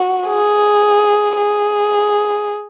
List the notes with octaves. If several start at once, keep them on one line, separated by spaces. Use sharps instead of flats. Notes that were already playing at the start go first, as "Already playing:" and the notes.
Already playing: F#4
G#4
G#4